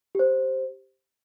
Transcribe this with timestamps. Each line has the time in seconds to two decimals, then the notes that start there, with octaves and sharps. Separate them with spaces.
0.15 G4 C5